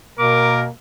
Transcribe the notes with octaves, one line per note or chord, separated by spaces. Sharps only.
B2 A#3 A#4 D6